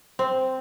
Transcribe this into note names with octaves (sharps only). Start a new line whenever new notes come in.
C4